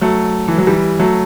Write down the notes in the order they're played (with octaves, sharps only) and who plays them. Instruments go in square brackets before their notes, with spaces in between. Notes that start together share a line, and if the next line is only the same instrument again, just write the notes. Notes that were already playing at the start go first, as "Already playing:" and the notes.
[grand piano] F#3 A3
E3
F#3
E3 G3
F#3 A3